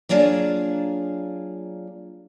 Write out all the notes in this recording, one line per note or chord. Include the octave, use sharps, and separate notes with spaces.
F#3 A#3 D4 F4 G#4 D5